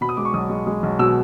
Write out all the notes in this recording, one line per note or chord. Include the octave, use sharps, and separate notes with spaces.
B2 B5
D#6
G#3 D6
C#6
B1 D#6
G#3
G#3
B1
B2 E6